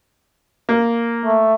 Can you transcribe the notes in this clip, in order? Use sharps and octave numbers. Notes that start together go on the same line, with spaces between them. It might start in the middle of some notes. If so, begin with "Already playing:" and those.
A#3
A3